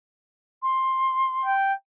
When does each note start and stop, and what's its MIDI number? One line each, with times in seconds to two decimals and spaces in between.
0.63 1.53 84
1.45 1.73 79